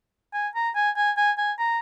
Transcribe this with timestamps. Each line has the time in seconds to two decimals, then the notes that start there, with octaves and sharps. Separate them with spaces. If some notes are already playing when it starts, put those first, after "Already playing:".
0.34 G#5
0.55 A#5
0.75 G#5
0.97 G#5
1.17 G#5
1.38 G#5
1.59 A#5